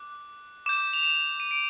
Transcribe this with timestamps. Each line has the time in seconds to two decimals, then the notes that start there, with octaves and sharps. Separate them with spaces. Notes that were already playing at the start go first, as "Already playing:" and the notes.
Already playing: D6 F#6
0.66 D6 G6 E7
0.93 F7
1.03 E7
1.40 D#7
1.51 D7